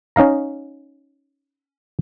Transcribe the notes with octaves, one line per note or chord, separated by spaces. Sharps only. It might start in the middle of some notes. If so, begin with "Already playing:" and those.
C#4 D#4 F5 A#5